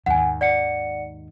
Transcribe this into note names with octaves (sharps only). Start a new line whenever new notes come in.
D#2 G#2 F#5 G#5
D5 F#5 C#7